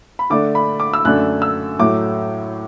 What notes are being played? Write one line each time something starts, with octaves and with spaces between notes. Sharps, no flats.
B5
D3 A3 D4 D6
B5
D6
E6
F#2 D3 A3 D4 F#6
E6
A2 F#3 A3 D6